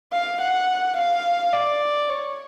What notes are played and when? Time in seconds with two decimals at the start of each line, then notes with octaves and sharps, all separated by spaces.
0.13 F5
0.41 F#5
0.97 F5
1.53 D5
2.10 C#5